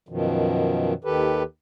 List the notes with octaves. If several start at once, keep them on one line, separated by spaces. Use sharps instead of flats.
F#2 B2 D#3 F3
D#2 D#3 G4 A4 B4